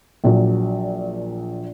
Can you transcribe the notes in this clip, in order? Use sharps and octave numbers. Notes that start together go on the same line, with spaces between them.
A#1 A#2 F#3